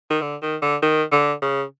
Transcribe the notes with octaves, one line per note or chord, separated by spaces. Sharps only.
D#3
D3
D#3
D3
D#3
D3
C#3